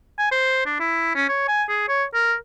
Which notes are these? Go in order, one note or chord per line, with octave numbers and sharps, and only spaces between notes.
G#5
C5
D4
E4
C#4
C#5
G#5
G#4
C#5
A#4